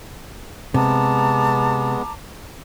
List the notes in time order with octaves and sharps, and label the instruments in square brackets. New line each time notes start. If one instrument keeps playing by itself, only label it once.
[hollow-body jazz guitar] C3 [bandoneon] G#3 B3 [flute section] A5 A#5 D6